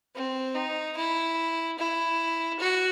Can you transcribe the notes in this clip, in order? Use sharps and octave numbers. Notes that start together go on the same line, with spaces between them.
C4
D#4
E4
E4
F#4